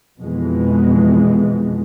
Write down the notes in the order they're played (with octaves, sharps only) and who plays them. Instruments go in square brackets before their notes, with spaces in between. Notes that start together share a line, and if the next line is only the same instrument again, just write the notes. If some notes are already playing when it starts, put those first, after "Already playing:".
[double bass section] F2 B2 E3 G#3